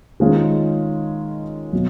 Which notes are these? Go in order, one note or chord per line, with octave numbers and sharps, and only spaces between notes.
D#3 G#3 C#4 F4
B2 F#3